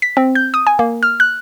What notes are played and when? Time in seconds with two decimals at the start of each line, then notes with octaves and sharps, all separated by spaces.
0.02 B6
0.17 C4
0.35 G6
0.54 D#6
0.67 G#5
0.79 A#3
1.03 F6
1.20 F#6